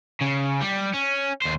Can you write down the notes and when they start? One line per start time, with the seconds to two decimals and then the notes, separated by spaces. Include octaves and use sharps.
0.21 C#3
0.61 G3
0.94 C#4
1.42 D#2 C5